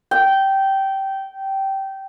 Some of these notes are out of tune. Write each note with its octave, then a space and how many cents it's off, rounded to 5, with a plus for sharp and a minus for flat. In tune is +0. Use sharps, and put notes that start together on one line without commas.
G5 -15